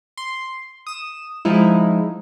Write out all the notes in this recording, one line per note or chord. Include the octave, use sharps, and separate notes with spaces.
C6
D#6 E7
F3 G#3 D#4 E4